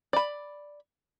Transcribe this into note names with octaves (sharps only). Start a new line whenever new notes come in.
D5 B5